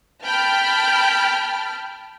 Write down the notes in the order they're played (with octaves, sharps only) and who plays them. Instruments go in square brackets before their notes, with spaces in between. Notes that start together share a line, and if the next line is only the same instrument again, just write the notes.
[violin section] G5 A5 B5 F6